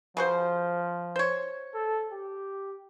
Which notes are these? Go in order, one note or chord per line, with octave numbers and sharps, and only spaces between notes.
C#3 F3 F#4 C5
C5 C#5
A4
G4